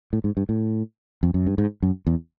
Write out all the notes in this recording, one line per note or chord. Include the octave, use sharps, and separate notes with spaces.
A2
G#2
G2
A2
F2
F#2
G2
G#2
F#2
E2